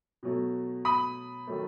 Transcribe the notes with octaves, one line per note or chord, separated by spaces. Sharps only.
B2 F#3 A3
B5 D#6
D#3 F#3 A3